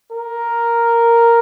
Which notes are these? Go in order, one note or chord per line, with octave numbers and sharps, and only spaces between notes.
A#4